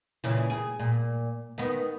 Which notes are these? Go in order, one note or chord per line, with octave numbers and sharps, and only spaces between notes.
A#2 C#3 E3
G#4
A#2
D#3 B3